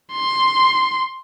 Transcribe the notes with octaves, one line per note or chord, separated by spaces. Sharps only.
C6